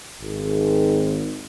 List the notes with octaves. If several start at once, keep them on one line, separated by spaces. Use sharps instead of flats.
G#1